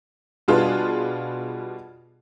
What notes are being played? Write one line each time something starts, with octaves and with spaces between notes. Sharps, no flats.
B2 G3 D4 F4 G#4 B4